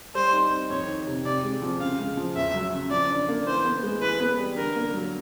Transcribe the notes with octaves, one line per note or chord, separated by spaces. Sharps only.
G3 C5
D#4
C4
F2 C#5
D#3
C3
C3 D5
G#3
F3
C#3 F5
G#3
F3
E2 E5
F#3
C#3
F3 D5
D4
A#3
E3 C5
B3
G#3
E3 B4
B3
G3
D3 A#4
A#3
F#3